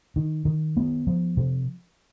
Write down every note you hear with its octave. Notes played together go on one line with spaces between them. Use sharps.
D#3
D#3
B3
F3
C3